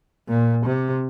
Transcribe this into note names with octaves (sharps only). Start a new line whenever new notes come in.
A#2
C3